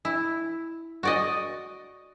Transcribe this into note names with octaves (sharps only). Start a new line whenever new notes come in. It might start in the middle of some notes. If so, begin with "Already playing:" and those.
E4
F#4 D5 D#5